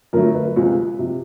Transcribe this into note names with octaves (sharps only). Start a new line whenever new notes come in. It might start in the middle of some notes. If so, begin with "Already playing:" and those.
F2 D3 F#3 A3 A#4
B4
C#2 C3 F3 G#3
C3 F3